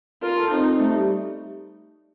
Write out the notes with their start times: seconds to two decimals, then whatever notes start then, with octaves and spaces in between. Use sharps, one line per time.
0.22 F4 A#4
0.37 A4
0.51 C4 D#4
0.80 A3
0.94 G3